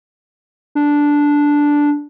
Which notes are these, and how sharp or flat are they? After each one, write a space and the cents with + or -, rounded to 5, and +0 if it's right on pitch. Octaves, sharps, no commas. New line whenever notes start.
D4 -5